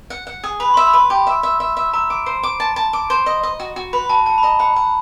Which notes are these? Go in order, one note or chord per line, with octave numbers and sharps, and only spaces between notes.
F#5
F#5
G#4
B4 B5
E5 C6
B5
B4
G4
E5
E5
E5
E5
E5 A#5
D6
C5
D6
A5
A5
D6
C5
D#5
D#5
F#4
F#4
B4 B5
F#4 A5
F#5 A5
B5
D#5 A#5
F#5 B5
F#5